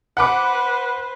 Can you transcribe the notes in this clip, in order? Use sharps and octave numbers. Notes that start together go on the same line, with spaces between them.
B4 C5 F#5 B5 D6